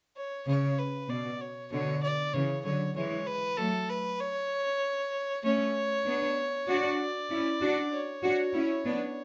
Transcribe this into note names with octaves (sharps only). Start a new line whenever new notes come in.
C#5
C#3 C#5
B4
B2 D5
C#5
B2 D3 C#5
D5
C#3 E3 C#5
D3 F#3 C#5
E3 G#3 C#5
B4
F#3 A3 A4
B4
C#5
A3 C#4 C#5
B3 D4
D4 F#4 D5
C#4 E4
D4 F#4
C#5
D4 F#4
C#4 E4
B3 D4